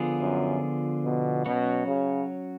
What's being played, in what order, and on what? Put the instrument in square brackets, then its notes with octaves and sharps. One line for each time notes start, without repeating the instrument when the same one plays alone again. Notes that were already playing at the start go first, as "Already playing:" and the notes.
Already playing: [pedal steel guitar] D3 F3 B3 F4 G#4
[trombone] F#2
B2
[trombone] B2 [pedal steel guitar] F#3 C#4 F#4 C#5
[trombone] C#3